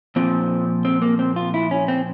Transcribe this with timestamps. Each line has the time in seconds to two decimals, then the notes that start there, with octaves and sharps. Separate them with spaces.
0.16 A#2 F3 C4
0.85 C4
1.02 A#3
1.19 C4
1.36 F4
1.54 E4
1.71 C#4
1.88 C4